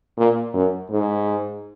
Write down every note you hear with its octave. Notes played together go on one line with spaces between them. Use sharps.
A#2
F#2
G#2